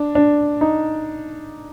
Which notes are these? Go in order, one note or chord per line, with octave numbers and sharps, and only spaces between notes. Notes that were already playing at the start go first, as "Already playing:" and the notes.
Already playing: D4
D4
D#4